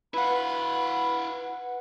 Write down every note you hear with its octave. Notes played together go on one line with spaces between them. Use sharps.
E4 B4 F5 F#5 B5